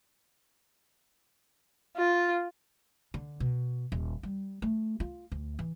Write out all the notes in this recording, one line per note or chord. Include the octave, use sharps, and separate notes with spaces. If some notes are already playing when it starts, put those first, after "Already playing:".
F4
D3
B2
D#1
G3
A3
F4
D2
E3